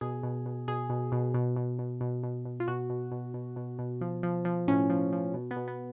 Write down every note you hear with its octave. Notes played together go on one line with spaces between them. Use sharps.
B2 G#4
B2
B2
B2 G#4
B2
B2
B2
B2
B2
B2
B2
B2
F4
B2 F#4
B2
B2
B2
B2
B2
F3
F3
F3
A2 C#4
F3
F3
B2
B3
B2
B3